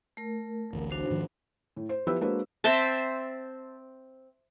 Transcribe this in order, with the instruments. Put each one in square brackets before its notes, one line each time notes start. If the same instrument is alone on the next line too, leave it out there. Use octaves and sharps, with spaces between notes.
[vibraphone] A3 A#4
[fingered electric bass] A1 D2 A2
[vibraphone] D4 F#4 C5
[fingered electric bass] G#2 D#3 F3
[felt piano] A2
C5
F3 B3 E4 G4 B4 E6
G#3 A#3 D4 F#4 B4 C5
[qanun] C4 C5 E5 A5